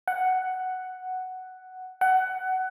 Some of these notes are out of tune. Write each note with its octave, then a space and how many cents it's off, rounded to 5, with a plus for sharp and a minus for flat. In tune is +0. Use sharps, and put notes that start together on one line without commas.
F#5 +5
F#5 +20